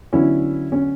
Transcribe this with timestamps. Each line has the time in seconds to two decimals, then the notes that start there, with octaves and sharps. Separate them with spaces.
0.13 D3 F#3 B3 C#4 E4
0.72 C#4